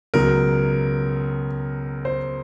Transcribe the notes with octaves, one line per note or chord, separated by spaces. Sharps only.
C#2 B2 F#3 A#4
C5